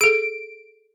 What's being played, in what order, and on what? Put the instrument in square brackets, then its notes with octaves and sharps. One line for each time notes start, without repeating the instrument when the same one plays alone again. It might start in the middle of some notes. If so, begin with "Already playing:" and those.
[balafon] G#4 A4 [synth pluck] D7